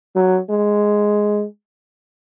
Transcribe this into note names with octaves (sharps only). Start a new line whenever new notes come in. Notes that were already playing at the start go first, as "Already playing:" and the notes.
F#3
G#3